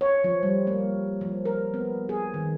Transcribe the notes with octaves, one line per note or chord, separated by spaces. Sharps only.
C#5
F3
G3
A#3
F3
A#4
B3
G#4
D#3